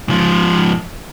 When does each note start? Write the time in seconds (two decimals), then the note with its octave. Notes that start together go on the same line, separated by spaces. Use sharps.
0.08 G#2 F3